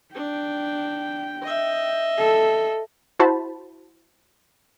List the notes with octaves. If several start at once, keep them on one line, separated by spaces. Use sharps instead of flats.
D4 G5
D#5 E5
A4
E4 F#4 C5 A5 B5